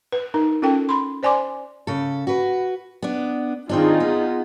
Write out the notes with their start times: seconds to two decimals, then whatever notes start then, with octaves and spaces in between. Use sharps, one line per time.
0.12 B4
0.34 D#4 A#4
0.62 C#4 F4 A4 A#4 G5
0.89 B5 C6
1.23 C5 D5 G#5 C6 D6
1.87 C#3 A4
2.27 F#4 B4
3.02 B3 D4
3.69 D#3 C4 D4 D#4 F4 G#4
4.00 B3